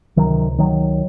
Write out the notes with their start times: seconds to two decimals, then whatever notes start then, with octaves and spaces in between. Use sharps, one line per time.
0.16 C#2 C3 D#3 F#3
0.58 D#3 F#3